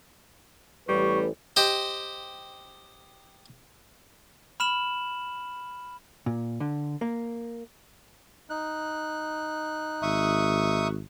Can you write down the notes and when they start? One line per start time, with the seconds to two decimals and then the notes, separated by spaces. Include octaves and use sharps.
0.88 A1 G3 B4 C#6
1.56 G4 C5 D#5
4.60 B5 F6 E7 F#7
6.26 A#2
6.60 D3
7.01 A#3
8.50 D#4 F#6
10.02 G#1 E5 C#6 D#6